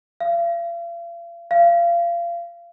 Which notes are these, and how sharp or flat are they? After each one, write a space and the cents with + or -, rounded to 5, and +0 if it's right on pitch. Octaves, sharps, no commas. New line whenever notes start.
F5 -40
F5 -30